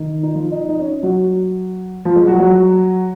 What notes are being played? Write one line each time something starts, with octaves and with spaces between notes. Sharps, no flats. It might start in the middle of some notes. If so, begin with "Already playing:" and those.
Already playing: D#3
D#4
F3 F4
D#4 D#5
D#4 D#5
C#4 C#5
F#3 F#4
F3 F4
G#3 G#4
F#3 F#4
F#3 F#4